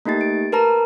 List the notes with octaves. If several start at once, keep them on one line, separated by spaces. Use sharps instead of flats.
A3 A#3 D#4 G4 A6
D7
A#4 B4 A5 A#5